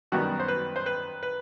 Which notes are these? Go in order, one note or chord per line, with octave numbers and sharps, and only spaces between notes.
F#2 D#3 G3 B3 F#4
C5
B4
C5
B4
B4